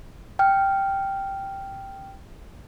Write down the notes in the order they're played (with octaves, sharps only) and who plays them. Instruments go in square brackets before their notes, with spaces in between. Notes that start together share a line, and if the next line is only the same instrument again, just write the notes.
[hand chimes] G5 F6